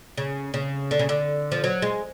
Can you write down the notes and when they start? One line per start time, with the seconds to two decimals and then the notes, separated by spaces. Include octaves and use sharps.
0.17 C#3
0.54 C#3
0.91 D3
0.99 C#3
1.09 D3
1.52 F3
1.64 F#3
1.82 G#3